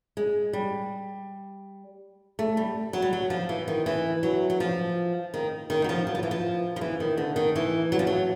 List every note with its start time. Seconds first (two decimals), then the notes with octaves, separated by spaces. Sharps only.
0.17 G#3
0.53 G3
2.39 A3
2.57 G3
2.93 F#3
3.02 G3
3.13 F#3
3.30 F3
3.49 E3
3.68 D#3
3.86 E3
4.23 F#3
4.50 F#3
4.60 F3
5.34 D#3
5.70 D#3
5.84 F#3
5.89 F3
6.07 F#3
6.15 F3
6.23 E3
6.31 F3
6.76 F3
6.81 E3
7.00 D#3
7.17 D3
7.36 D#3
7.56 E3
7.92 F#3
7.99 F3
8.07 F#3